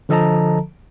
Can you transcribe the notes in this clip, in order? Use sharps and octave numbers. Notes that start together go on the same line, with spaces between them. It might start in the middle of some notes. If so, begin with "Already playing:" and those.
D3 F3 A4 D#5 A5 A#5